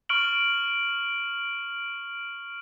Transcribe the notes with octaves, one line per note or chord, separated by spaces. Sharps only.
C#6 F6 D7 F#7